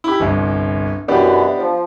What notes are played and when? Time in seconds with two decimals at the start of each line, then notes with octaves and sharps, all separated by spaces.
0.04 E4 G4
0.20 G1 C2
1.08 F#2 B2 E3 B3 D4 G4
1.58 F3